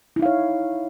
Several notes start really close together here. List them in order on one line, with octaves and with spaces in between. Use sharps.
E4 D#4 F5 C#5